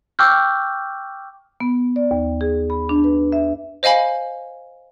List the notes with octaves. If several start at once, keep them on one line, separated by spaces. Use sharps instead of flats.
G5 C#6 D6 E6 F6 G6
B3
D5
D#2
G#4
B5
D4
B4
E5
C5 D#5 F5 G#5 B5